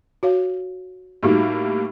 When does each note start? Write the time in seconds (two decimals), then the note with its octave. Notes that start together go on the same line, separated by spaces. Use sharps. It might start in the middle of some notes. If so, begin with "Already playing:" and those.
0.23 F#4 C#5 F5
1.23 A2 G3 A#3 D#4 F#4